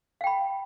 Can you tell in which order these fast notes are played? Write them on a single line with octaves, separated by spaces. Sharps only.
F5 G5 B5